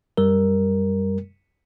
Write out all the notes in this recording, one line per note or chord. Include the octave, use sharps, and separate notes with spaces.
F#2 G3 A#4